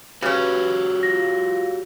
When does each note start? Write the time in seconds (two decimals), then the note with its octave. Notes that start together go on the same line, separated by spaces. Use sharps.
0.22 C#3 C#4 F#4 G4 B4 C#5
1.03 F4 A#6